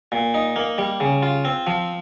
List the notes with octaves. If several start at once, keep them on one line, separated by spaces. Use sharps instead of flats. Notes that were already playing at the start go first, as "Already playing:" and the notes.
A#2
D#4
A#3
G3
C#3
F4
C4
F3